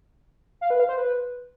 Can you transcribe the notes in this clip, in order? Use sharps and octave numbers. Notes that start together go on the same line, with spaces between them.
F5
B4
F5
C5
B4